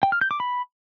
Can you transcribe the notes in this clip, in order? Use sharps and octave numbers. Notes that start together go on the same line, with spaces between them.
G5
F6
G6
D6
B5